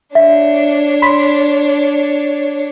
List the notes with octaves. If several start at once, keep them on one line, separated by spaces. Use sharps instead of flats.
D4 C#5 E5
B5 C6 B6